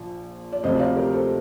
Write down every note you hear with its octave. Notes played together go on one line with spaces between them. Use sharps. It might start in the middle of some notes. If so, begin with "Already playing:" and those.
Already playing: A#1 A#2 F3
D5
D2 C3 F3 C5 D#5
D5 F5
G4 A#4
A4 C5